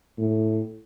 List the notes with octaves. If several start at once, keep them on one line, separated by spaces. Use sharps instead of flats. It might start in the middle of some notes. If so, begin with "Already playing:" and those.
A2